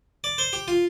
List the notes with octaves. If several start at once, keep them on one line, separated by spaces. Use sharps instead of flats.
D5
C5
G4
F4